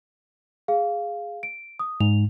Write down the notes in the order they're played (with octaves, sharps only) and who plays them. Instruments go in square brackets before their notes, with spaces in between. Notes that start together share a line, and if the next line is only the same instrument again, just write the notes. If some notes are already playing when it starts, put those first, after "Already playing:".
[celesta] G#4 F5
D7
D#6
[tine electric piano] G#2 [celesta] F7